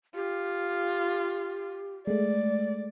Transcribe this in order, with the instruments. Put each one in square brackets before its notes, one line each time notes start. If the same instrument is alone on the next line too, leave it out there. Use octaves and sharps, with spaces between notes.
[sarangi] F4 [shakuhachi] G4
[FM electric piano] G#3 A3 [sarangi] D5